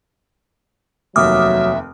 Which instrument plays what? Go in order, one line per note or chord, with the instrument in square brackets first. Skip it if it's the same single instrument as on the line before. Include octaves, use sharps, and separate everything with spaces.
[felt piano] F1 D#2 [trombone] F#3 [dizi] E5 [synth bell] D6 D#6 F6